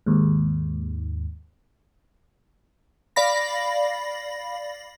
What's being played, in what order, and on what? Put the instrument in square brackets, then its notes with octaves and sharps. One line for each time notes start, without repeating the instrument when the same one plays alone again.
[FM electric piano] D#2 G#2
[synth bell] D5 F5 B5 A#6